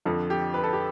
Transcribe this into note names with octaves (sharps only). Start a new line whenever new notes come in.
F2 D3 F3 A4
G4
B4
A4
G4